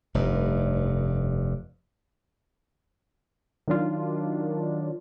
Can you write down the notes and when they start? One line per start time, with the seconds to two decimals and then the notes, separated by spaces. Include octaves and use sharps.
0.14 F1 G2
3.68 D#3 F#3 D4 F4